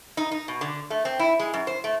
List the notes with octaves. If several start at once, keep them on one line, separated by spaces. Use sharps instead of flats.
D#4
D#4
B2
D3
A3
C4
E4
G#3
F#2
C5
A3